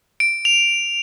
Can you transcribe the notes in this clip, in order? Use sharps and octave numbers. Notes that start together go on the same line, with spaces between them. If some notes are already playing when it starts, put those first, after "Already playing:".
D7
F7